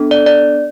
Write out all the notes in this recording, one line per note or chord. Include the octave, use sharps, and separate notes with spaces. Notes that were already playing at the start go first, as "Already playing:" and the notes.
Already playing: B3 D4 A4
D5
D5